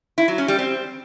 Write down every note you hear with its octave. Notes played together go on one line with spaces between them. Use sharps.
E4
F#3
C#4
G3
C4